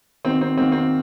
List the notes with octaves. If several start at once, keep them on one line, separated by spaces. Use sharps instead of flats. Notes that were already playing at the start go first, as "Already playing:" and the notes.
D#3 A#3 C4 D#4 F#4
C4
D#3 A#3 C4 D#4 F#4
C4